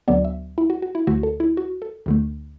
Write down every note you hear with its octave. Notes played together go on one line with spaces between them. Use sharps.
D2 D3 F#3 B3 D5
E5
E4
F#4
F#4
E4
D2 D3 A3 F#4
A4
E4
F#4
A4
D2 D3 A3